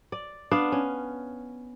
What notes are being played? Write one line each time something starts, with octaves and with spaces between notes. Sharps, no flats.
D5
B3 D4 F5
C#4